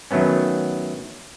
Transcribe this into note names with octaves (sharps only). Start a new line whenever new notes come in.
D#3 F#3 A3 B3 C#4